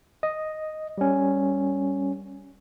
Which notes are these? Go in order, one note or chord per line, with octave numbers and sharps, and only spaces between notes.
D#5
G3 C#4